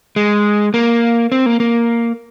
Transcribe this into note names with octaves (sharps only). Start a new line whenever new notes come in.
G#3
A#3
C4
A#3
A#3